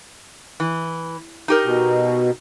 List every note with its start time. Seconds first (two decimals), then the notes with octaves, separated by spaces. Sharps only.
0.60 E3
1.48 D#4 G4 A#4
1.64 B2